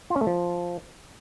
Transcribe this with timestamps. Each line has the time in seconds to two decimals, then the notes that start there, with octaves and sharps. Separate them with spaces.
0.10 F4
0.16 C#4
0.21 A3
0.27 F3